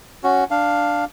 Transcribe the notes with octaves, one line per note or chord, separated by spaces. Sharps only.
C#4 F#4
D4 F5